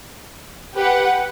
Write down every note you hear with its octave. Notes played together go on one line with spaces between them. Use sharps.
G4 B4 F#5